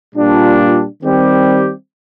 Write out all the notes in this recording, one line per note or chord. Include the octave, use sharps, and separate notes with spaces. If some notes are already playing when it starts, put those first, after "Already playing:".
A#2 G3 D4 F4
D#3 G3 C4 G4